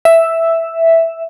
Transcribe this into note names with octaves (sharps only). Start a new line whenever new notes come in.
E5